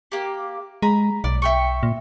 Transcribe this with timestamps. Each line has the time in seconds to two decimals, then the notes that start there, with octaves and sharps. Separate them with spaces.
0.12 A#3 G4
0.82 G#3 A#5 B5
1.24 B1 D5
1.42 E5 G5 C#6
1.83 A#2